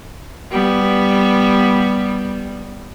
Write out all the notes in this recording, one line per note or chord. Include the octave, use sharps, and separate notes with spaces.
G3 B3